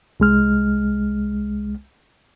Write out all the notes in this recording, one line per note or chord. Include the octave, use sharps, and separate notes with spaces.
C2 G#3 F6